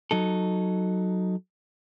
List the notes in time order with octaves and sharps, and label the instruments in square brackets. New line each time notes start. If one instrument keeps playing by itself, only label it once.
[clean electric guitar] F#3 D#4 A4